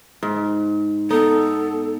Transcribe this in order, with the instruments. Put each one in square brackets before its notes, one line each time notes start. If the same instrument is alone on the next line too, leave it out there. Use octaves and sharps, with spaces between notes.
[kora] G#2
[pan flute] B3 [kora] D#4 [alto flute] A4